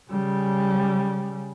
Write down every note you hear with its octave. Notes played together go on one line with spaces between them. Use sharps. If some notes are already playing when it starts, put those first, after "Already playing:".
C#3 G3